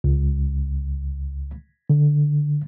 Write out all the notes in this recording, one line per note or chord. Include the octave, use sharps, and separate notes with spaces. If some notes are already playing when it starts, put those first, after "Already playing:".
C#2
D3